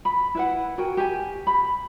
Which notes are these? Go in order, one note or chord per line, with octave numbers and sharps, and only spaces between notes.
B5
E4 B4 F#5
F#4 A#4 G5 G#5
G4 G#5
B5